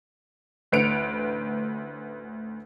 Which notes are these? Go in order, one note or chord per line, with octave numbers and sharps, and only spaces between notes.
A1 D2 B4 C#7 D7 F7